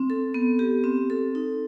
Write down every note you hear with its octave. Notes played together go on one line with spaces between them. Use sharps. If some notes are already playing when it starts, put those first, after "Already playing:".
Already playing: C4
A4
B3
G4
C4
A4
D#4